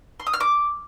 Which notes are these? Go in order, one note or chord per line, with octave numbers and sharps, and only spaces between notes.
C6
D#6
F6
D6